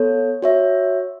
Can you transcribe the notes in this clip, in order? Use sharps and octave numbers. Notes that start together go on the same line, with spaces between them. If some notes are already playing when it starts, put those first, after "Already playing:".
Already playing: B3 A4 C#5
F#4 C#5 E5